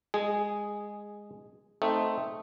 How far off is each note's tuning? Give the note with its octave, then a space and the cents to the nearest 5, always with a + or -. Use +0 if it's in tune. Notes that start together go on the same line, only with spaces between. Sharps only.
G#3 -10 G#4 +0
A3 +0 C4 +0 D#4 +0